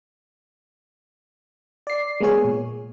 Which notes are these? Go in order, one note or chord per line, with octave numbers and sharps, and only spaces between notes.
D5 C7
G#3 A#3 B3 G#4 C#5
A#2